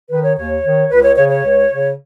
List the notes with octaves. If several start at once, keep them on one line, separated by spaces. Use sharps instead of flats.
D#3 B4
C#5
D#2 C#5
D#3
C#2 B4
C#5
C#3 C#5
C#5
C#2
C#3